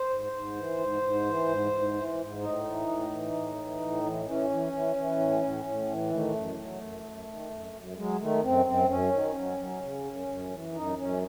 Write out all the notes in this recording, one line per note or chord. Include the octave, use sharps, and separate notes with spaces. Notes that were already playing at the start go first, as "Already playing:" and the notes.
Already playing: C5
G#2
G#2
E3
G#2
G#2
E3
G#2
G#2
E3
G#2
A2 D#4
E3
A2
E3
A2
E3
A2
E3
E3 C#4
E3
E3
E3
A2
A2
A2
E3
D#3 A3
F#2
F#3
F#2
F#2
D#3
F#2
F#2
F#3 G#3
D#3 A3
F#2 C4
F#2 C4
F#2 C#4
D#3
F#3
F#3
C#3
F#2
F#2
E3
F#2 D#4
F#2 C#4